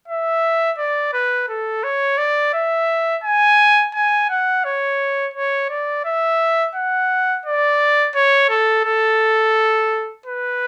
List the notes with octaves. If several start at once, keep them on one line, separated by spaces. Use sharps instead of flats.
E5
D5
B4
A4
C#5
D5
E5
G#5
G#5
F#5
C#5
C#5
D5
E5
F#5
D5
C#5
A4
A4
B4